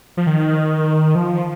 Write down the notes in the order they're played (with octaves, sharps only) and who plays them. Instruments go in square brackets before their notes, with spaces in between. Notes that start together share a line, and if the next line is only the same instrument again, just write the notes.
[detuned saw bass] F3
D#3
F3